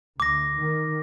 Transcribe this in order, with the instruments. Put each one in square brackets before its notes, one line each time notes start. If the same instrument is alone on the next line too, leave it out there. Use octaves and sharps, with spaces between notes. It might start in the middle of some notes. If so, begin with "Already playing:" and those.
[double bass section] D2 [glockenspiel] D6 A#6
[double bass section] D#3